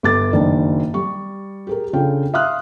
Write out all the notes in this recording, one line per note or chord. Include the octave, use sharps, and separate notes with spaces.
G1 D6 A6
F#1 D#3 D4 D5
G3 C#6
G4 G#4 A#4
C#3 D4 F4 A4 G5
E5 F5 C6 D#6 F6 F#6